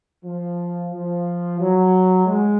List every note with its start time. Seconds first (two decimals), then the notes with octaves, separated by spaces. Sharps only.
0.24 F3
0.92 F3
1.60 F#3
2.26 G#3